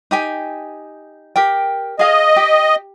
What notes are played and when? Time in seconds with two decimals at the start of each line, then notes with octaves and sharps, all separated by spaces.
0.11 D#4 G4 G#5
1.36 G4 A#4 G5
1.99 G#4 D#5 F5
2.36 G4